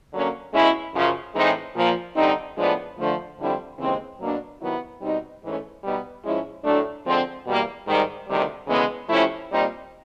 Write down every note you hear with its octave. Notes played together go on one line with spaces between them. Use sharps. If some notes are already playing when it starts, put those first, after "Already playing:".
D3 F#3 A#3 C#4
B2 G#3 C#4 E4
F#2 C#3 F3
A2 E3 G#3 C4 D#4
A#2 F3 A#3
D3 G3 C4 D#4
A2 F3 G#3 B3 D4
D3 F3 A3
F2 D3 G3 C4 E4
D#2 C#3 E3 G#3 C4
B2 F#3 A#3 D4
C3 D#3 F#3 B3 E4
B2 G3 C4 D#4
G#2 E3 A3 C#4
B2 G3 B3 D#4
G#2 F3 G#3 C#4 E4
A2 F#3 A3 D4
D3 F3 G#3 C4
E2 B2 G3 A#3
G#2 D#3 G3
D2 C3 D#3 G3
D2 C#3 E3 G#3 B3
C3 F3 A3 C#4 E4
A#2 G3 C4 D#4